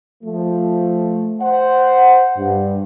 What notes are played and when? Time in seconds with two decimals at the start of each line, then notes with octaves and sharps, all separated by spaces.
0.24 F3 A3
1.42 C5 F#5
2.37 G2